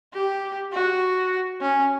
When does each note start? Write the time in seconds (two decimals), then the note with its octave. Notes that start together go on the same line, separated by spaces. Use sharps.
0.14 G4
0.73 F#4
1.61 C#4